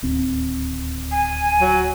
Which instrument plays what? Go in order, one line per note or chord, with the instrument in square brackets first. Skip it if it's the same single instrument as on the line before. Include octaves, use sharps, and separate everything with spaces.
[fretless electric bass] D1 D#2 C4
[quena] G#5
[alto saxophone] F#3